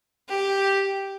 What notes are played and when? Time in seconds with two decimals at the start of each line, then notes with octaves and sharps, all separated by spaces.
0.29 G4